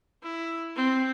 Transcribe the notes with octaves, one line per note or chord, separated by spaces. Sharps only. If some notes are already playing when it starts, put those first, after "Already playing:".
E4
C4